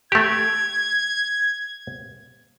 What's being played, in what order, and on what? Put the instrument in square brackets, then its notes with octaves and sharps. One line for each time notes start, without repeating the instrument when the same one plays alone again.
[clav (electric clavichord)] A3 G4 [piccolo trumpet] G#6